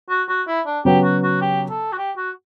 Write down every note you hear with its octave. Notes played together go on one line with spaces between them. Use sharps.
F#4
F#4
E4
D4
C#3 F#3 B3 G4
F#4
F#4
G4
A4
F#4
G4
F#4